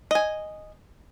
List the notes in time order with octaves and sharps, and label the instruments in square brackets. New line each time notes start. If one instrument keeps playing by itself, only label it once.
[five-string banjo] D#5 G#5